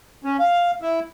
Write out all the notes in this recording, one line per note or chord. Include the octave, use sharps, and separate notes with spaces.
C#4
F5
E4